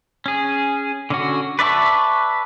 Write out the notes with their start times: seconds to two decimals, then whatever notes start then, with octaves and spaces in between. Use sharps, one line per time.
0.26 C#4 G#4
1.10 D3 C#4 F#4
1.59 B4 D5 E5 A5 C#6